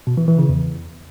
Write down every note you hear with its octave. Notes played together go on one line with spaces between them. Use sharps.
B2
E3
E3
C#3
E2